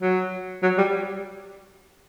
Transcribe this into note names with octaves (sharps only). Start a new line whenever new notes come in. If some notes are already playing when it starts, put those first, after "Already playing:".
F#3
F#3
G3